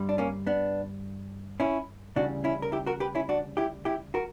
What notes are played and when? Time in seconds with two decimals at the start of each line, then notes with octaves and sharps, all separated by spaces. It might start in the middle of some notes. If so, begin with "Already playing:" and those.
Already playing: G2 D3 G3
0.09 D4
0.18 A#3 C#4
0.47 B3 D4
1.60 C#4 E4
2.16 D2 C#3 E3 G3 D4 F#4
2.44 C#4 E4
2.62 A#4
2.72 E4 G4
2.86 F#4 A#4
3.00 G4 B4
3.15 C#4 E4
3.29 D4 F#4
3.57 E4 G4
3.85 E4 G4
4.14 F#4 A#4